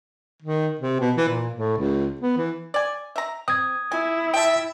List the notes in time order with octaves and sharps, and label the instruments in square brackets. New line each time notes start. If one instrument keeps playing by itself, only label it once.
[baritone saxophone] D#3
C3
B2
E3
A#2
A2
C#2
B3
E3
[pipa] D5 G#5
E5 A#5
[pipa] C4 [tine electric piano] D#6 G#6
[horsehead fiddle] E4 [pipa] G#5
[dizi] E5 [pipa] G5 A5